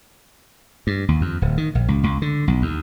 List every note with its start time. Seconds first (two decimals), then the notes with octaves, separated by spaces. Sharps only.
0.87 G2
1.08 D#2
1.21 F2
1.42 D1
1.57 D#3
1.75 A#1
1.88 C#2
2.03 C#2
2.22 D3
2.48 B1
2.62 D#2